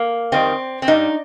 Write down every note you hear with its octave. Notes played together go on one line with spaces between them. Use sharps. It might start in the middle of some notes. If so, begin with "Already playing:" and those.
Already playing: A#3
F2 D#3 G3 C4
C4
G2 G3 D#4